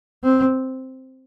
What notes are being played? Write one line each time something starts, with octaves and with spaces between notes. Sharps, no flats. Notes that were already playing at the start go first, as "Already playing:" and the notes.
C4